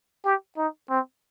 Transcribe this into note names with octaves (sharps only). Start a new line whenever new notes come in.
G4
D#4
C4